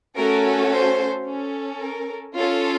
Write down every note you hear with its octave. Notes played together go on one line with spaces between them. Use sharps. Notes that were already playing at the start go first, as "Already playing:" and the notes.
A3 C#4 F#4 A4 A#4
C5
C#4 A4
A#4
C#4 F4 A4